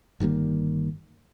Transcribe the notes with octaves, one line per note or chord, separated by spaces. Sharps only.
G1 D#3 G3 A#3